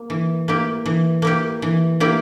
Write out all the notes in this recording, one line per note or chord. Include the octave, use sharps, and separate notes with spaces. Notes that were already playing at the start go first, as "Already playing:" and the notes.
Already playing: A#3
E3
A#3 E4 G4
E3
A#3 E4 G4
E3
A#3 E4 G4